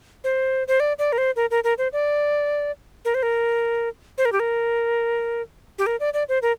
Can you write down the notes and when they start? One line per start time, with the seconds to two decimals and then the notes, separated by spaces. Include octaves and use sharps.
0.24 C5
0.68 C5
0.80 D5
0.99 D5
1.12 A#4
1.18 C5
1.36 A#4
1.51 A#4
1.64 A#4
1.78 C5
1.93 D5
3.05 A#4
3.14 C5
3.23 A#4
4.18 C5
4.25 A#4
4.32 G4
4.39 A#4
5.78 G4
5.86 A#4
6.00 D5
6.14 D5
6.29 C5
6.42 A#4